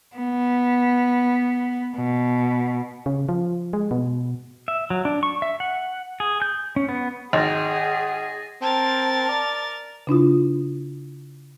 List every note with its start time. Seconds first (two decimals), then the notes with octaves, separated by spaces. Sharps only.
0.16 B3
1.96 B2
3.06 C#3
3.29 F3
3.73 G#3
3.91 B2
4.68 E5
4.90 F#3
5.05 D4
5.23 C#6
5.42 E5
5.60 F#5
6.20 G#4
6.42 G6
6.76 C#4
6.89 B3
7.33 G#1 G#4 F#5 A6 A#6
8.62 C4 A#4 A5 A6
9.29 D5
10.07 C#3 D4 E4 F4